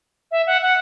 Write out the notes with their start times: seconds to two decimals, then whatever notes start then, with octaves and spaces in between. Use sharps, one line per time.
0.31 E5
0.47 F#5
0.62 F#5